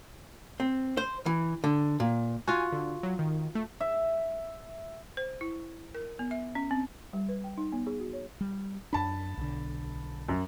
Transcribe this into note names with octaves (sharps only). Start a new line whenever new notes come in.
C4
C5
E3
D3
A#2
F4 F#4 G#5
D3
F#3
D#3
A3
E5
C5
E4
A#4
B3
E5
C#4
C4
G3
B4
G5
D#4
B3
G#4
F#4
C#5
G3
F#2 D4 A5 B5
B1 D3
F#2